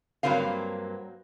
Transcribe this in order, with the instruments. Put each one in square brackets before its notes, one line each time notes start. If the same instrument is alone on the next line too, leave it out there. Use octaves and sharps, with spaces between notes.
[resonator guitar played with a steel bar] G2 F3 F#3 A#3 C4 F5